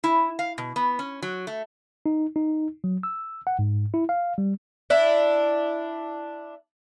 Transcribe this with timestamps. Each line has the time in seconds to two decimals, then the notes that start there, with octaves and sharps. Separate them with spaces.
0.04 E4
0.39 F5
0.58 B2
0.76 B3
0.99 C#4
1.22 F#3
1.47 A3
2.06 D#4
2.36 D#4
2.84 F#3
3.03 E6
3.47 F#5
3.59 G#2
3.94 E4
4.09 F5
4.38 G3
4.90 D4 E4